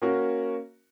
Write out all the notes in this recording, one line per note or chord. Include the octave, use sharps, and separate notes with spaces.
A#3 C#4 F#4 A#4